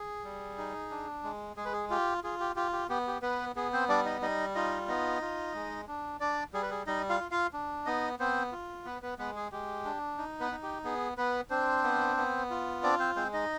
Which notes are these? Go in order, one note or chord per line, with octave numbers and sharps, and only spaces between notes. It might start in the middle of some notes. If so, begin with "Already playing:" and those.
Already playing: G#4
G3
D#4
D4
G#3
G#3 G#4
B4
G#4
F4 G4
F4 G#4
G4
F4 G4
G4
B3 G4
G4
B3 B4
B3 G#4
C4 C5
G3 D4 D5
D#4 D#5
G3 D#4 D#5
D#4 F4 D#5
B3 D#4 D#5
F4
G#3
D4
D4 D5
G3 G#4
B4
G#4
G3 D#4 D#5
F4 F5
F4
F4 F5
D4
B3 D#4 D#5
B3 C4 C5
F4
B3 B4
B3 B4
G#3 B3 B4
G#4
G#3 G4
D4
D#4
B3 B4
D#4
G4
B3 G#4
B3 B4
C4 D4 C5
B3
B3
F4
C4 D4 D5
C4 C5
G#3 C4 C5
D#4 D#5